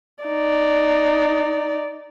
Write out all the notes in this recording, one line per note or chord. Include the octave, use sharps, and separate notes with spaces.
D#4 D5